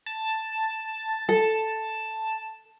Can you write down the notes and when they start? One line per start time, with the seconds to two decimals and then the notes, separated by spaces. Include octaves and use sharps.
0.06 A5
1.29 A4